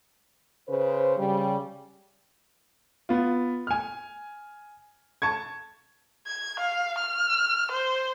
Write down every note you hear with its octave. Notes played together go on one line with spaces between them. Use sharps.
C#3 B4 C5
C#3 G3
B3 F4
G#5 F6
A5 C#6 G#6
G#6
F5
F6
C5